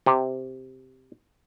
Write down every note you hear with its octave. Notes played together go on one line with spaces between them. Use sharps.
C3